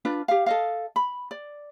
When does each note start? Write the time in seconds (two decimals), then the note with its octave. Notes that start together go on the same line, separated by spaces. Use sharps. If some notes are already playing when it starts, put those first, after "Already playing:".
0.05 D4 F4 B4
0.28 G4 F5
0.46 A4 D#5 F5
0.96 B5
1.31 D5